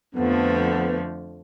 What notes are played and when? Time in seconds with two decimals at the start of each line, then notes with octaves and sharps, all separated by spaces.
0.15 F2 D3 F3 A3 B3